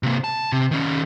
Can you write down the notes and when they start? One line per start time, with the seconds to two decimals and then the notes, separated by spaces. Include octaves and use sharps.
0.03 C3 A#3
0.24 A5
0.52 C3
0.71 D#3 C#4